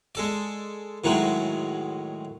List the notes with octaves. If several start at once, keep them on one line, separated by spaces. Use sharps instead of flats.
G#3 A4 D5
A2 D#3 F#3 G#3